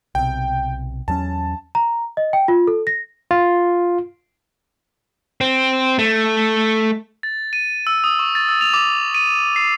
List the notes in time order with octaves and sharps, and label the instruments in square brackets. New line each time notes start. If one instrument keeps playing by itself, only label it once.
[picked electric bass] B1 C3 [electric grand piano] G5
[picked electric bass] E2 F#3 C#4 [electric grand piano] A5
[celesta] A#5
D#5
G5
F4
A4
A#6
[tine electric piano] F4
[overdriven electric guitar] C4
A3
[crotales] A6
D#7
E6
D#6
C#6
A6
E6
F7
D6
D#7
C7